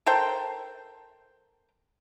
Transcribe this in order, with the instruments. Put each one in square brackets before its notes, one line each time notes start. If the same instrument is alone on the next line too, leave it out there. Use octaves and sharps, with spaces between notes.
[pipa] A4 A#4 C5 G5